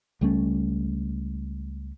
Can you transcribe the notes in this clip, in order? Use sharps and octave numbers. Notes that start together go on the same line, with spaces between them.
C#2 G3 A3 C#4